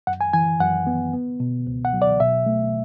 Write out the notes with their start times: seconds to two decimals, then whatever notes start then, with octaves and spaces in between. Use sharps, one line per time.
0.07 F#2 F#5
0.21 G#5
0.33 E3 G#5
0.60 F#2 F#5
0.87 B3
1.13 B3
1.40 B2
1.67 C#2
1.85 F#5
1.93 F#3
2.02 D5
2.20 B2 E5
2.46 A3